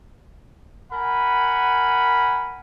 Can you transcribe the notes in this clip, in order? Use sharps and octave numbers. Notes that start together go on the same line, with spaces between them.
A#4 F#5 G#5 B5